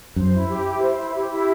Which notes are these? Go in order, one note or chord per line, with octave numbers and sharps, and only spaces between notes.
F#2 C5
E4
G4
E4
C5
E4
G4
E4